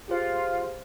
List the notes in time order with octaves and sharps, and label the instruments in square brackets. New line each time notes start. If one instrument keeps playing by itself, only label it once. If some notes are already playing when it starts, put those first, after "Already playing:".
[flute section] F4 [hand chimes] G4 G#4 C5